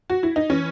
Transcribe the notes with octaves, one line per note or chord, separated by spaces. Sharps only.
F#4
E4
D#4
E3 C#4